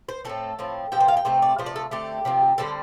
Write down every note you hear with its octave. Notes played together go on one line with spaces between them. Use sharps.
C5
A2 A3 C4 A4
A2 F3 C4
C3 F3 C4 G4
C5
F5
G5
C3 A3 C4 C5
D5
C3 F3 A3 C5
D5
A4
D3 A3 C4 G4
C3 F3 C4
D3 G3 C4 A4